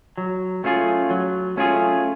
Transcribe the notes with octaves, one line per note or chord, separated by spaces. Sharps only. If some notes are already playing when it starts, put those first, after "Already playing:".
F#3
A3 C#4 F4 G#4
F#3
A3 C#4 F4 G#4